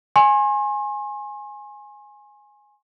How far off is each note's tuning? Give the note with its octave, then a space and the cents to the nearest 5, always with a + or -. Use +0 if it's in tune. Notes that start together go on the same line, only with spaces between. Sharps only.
G#5 +0 C6 +45